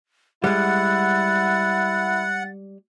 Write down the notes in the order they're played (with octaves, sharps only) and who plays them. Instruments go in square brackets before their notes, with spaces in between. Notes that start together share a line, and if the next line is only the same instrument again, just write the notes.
[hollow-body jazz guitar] G3 G#3 [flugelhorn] E4 [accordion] F#5 [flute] A6